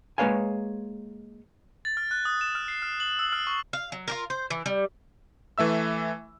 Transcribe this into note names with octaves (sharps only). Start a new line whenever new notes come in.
G#3 A#3 B4 C#5 F5 G#5
A6
F6
F#6
D#6
E7
F6
C7
F6
F#7
E6
F6
C#6
F5
F#3
F4 G4 A#4
C5
E3
G3
E3 A3 E5 E6